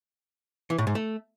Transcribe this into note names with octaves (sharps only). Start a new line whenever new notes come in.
E3
A2
G#2
A3